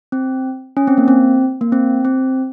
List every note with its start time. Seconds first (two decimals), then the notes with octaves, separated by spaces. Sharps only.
0.12 C4
0.77 C#4
0.87 C4
0.98 A#3
1.08 C4
1.61 A#3
1.72 C4
2.05 C4